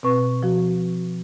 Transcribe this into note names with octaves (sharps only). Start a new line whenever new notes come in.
B2 C4 B4 C#6
F3 F#4